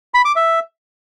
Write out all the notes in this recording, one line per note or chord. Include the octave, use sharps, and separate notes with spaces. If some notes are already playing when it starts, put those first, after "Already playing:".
B5
D6
E5